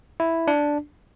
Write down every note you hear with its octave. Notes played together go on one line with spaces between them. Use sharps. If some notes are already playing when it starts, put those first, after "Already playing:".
E4
D4